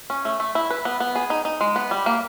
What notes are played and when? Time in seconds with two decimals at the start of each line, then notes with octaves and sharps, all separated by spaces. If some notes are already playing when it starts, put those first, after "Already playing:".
0.10 C#4
0.25 A3
0.40 A3
0.55 E4
0.70 B4
0.85 B3
1.00 B3
1.15 G#4
1.30 D#4
1.45 D#4
1.61 G#3
1.76 B3
1.91 G3
2.06 A#3